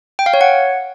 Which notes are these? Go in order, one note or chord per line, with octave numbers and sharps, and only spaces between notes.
G5
F5
C#5
F#5